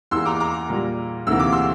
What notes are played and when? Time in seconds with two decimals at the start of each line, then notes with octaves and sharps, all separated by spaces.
0.11 E2 E3 A#3 C6 E6
0.25 A#5 D6
0.40 A#5 D6
0.69 A#2 G3 A#3
1.27 D2 C3 E3 A#3 E6
1.39 D6
1.52 C6 E6